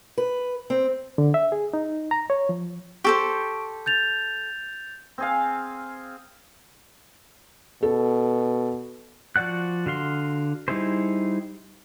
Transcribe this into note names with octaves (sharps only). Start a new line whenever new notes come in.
B4
C4
D3
E5
G#4
D#4
A#5
C#5
F3
G4 A4 C5 C#6 D7
G6 A6 F7
C4 G#4 F5
B2 A4
F3 F#4 D5 F#5 F#6
D3 F#4 F5 C6
G3 D#4 E4 G#4 C5